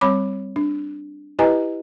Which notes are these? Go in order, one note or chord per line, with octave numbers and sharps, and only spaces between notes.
G3 C4 C#5 B5 D6
D4
E4 G4 B4 D#5 G#5 A#5